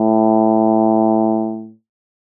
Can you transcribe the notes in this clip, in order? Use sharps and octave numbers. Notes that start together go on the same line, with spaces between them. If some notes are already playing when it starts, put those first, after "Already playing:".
Already playing: A2